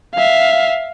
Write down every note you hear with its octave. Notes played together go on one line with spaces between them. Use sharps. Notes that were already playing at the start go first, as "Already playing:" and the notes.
E5 F5